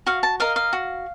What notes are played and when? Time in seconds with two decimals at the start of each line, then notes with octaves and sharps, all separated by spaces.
0.07 F#4 F5
0.23 A5
0.40 A#4 D#5 F5
0.56 F5
0.73 F#4